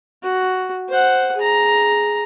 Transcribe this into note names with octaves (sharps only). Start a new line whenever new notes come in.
F#4
C5 F#5
G#4 A#5